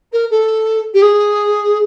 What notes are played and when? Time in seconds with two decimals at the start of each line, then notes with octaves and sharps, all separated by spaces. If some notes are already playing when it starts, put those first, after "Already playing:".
0.12 A#4
0.30 A4
0.94 G4
1.02 G#4